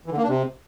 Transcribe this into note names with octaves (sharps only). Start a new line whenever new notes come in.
E3
D3
A#3
D4
C3